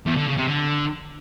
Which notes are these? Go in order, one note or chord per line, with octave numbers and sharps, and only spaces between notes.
E2
D3
C#3
C3
D3